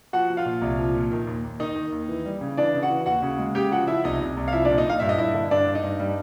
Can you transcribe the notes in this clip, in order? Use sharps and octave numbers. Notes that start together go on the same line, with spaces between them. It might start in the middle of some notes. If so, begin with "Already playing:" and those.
F3 F#4 F#5
F3
F4 F5
A#2
C2
F3
A#2
D#3
D#2
D#2
D#3 D#4 D#5
D#3
D#2
E3
G3
C#3
E3 D4 D5
C#3
F#4 F#5
E3
D#2 F#4 F#5
C#3
G#3
C#3 G4 G5
F3 F#4 F#5
F3 E4 E5
C2 D#4 D#5
C2
C2
F5
F3 E4 E5
D4 D5
A#2
D#4 D#5
A#2 F5
G2 E5
D#5
G2 E4 E5
D3
G2 D4 D5
G2
D#4 D#5
G2
G3